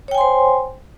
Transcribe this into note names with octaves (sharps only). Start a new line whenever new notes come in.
C5 C#5 G5 G#5 C6